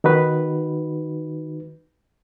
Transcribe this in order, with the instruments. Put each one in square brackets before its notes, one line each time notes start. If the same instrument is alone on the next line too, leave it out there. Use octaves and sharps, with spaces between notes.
[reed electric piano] D#3 D#4 F#4 B4